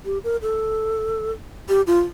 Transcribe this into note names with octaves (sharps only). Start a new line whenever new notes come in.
G4
A#4
A4
G4
F4